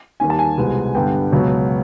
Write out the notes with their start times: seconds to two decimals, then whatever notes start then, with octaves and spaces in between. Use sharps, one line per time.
0.20 D#2 D#3 G3 A#3 G#5
0.30 A5
0.39 G#5
0.58 C2 B2 G#3 B3
0.95 G2 D3 G3 B3 G5
1.32 C#2 B2 F#3 B3